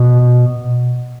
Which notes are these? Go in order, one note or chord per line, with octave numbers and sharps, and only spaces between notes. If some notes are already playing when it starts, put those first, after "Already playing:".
Already playing: B2